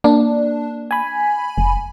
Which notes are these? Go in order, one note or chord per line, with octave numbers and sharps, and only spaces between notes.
A#3 D4
G#5 B5
F1